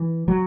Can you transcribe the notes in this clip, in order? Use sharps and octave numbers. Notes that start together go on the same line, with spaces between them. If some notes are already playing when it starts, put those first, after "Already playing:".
Already playing: E3
F#3